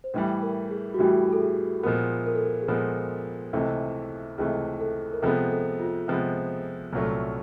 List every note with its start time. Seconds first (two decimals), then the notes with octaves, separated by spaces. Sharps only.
0.04 C5
0.14 A2 E3 G3 B4
0.42 A#4
0.71 G#4
0.94 F#4
0.99 A2 E3 G3 G4
1.33 A4
1.41 G#4
1.83 A#2 F3 G#3 B3 A#4
2.26 A#4
2.35 A4
2.44 A#4
2.62 G#4
2.68 A#2 F3 G#3 B3 A4
3.53 C#2 C3 E3 A3
4.38 C#2 C3 E3 A3 G#4
4.80 A4
5.13 A#4
5.22 C3 F3 G#3 B3 A4
5.51 A4
5.80 F4
6.08 C3 F3 G#3 B3
6.93 C2 A#2 F#3 A3